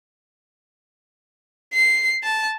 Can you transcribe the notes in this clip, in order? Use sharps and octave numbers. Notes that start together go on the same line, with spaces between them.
C7
A5